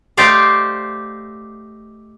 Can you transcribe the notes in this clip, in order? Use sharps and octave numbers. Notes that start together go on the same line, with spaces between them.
A3 D#4 G4 C5 D5 F5